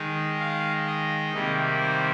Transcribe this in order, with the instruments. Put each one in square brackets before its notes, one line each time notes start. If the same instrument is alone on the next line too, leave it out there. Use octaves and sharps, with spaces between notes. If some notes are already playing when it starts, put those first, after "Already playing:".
Already playing: [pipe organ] D#3 G#3 D#4
F5
D#5
C3 D#3 G3 A#3
C5